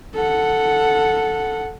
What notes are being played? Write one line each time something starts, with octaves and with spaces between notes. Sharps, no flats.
A4 F#5